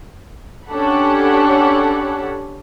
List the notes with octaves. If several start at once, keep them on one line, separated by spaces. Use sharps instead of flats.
C#4 D4 G4 A4 F#5 B5